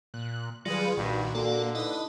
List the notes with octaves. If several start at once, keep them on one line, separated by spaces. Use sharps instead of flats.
A#2 F#6
D#3 F#3 G3 F4 G#4 B4 D5
B1 G2 A#2 D#3 F#4
D3 A#3 F#4 A4 D5
D#4 E4 B4 D#5 A5